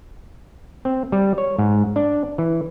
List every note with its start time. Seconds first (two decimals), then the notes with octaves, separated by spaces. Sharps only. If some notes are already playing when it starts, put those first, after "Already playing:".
0.85 C4
1.12 G3
1.38 C#5
1.59 G#2
1.96 D4
2.38 E3